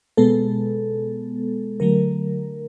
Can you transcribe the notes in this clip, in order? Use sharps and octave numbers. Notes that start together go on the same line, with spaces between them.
B2 G#3 B3 A4
D3 F#3 A3 A#4